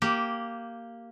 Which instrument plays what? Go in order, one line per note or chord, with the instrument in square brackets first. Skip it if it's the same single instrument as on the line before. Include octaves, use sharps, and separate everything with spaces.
[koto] A#3 G4